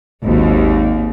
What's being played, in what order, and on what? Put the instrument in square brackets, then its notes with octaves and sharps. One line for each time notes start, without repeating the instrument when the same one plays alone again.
[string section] G#1 D#2